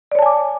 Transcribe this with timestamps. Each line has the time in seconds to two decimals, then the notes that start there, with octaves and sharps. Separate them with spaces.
0.12 D5
0.15 C#5
0.19 A5
0.22 G#5
0.26 D6